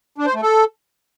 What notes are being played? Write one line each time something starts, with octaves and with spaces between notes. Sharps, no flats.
D4
C5
A3
A4